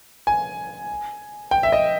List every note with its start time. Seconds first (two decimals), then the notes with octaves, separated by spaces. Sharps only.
0.27 G#5
1.51 G5
1.63 E5
1.72 D#5